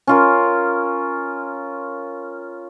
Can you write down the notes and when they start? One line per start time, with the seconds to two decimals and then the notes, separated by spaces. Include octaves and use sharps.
0.07 C#4 F4 A#4